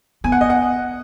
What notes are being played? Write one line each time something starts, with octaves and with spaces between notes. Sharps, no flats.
B3 G#5
F#5
D#5
F#5